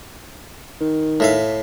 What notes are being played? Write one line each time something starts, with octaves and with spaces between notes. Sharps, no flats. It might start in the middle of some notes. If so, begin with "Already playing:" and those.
D#3
A2 E5 F5